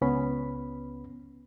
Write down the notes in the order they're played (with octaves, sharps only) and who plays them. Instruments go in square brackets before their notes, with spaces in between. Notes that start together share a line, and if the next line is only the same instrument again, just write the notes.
[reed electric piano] C#2 B3 C#4 B5